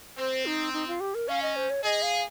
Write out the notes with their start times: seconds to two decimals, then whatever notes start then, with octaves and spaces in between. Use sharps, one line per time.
0.18 C4 C5
0.46 D#4
0.73 D#4
0.88 F4
1.00 G4
1.15 A#4
1.29 C#4 F5
1.42 D#5
1.56 C5
1.70 C#5
1.84 G#4 D#5
2.02 F5